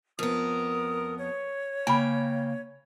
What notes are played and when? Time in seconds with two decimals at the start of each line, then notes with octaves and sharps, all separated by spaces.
0.19 F2 B3 A#4 D#6
1.18 C#5
1.87 C#3 A#3 G5 G#5 B5